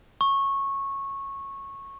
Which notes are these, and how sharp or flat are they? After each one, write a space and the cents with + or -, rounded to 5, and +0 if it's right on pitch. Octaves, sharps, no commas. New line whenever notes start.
C#6 -15